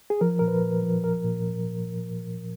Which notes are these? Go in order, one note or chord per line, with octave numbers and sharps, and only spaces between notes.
G#4
F3 A#4
A#2 A#4
B4
A#2
F3
F3 A#4
A#2